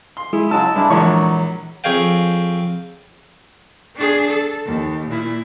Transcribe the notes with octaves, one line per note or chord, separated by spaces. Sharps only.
C6
G#3 E4 G#4
C#3 F#3 G#3 A5 E6
G2 G#3 D4 E4
A#1 D3 E3 F#3 G#3 C#5 C#6
F2 G#4 C#5 F5 G5
D4 G#4
A4
D#2
A#2 E4